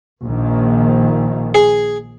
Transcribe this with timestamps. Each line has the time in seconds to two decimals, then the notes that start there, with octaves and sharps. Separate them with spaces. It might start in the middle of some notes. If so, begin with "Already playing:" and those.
0.22 A#1 D#3
1.55 G#4